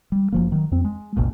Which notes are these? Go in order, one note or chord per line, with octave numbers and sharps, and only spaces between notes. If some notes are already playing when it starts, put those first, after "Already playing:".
G3
F#1 F3 A#3
D#3 F#3
F2 C4
G#3
F#1 C2 A#2